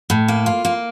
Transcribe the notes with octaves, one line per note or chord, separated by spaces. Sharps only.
A2
A#3
F4
A#3